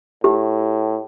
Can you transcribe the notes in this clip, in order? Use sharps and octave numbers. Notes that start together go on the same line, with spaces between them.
A2 G4